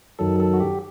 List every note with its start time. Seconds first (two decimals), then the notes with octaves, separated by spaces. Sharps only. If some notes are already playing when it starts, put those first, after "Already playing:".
0.19 F#2 D#3 F#3 A4
0.40 A4
0.54 F#4
0.60 G4